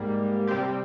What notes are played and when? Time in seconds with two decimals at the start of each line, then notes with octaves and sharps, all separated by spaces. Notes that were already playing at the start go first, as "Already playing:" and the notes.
Already playing: G#2 G3 A#3
0.47 C3 G3 C4 G4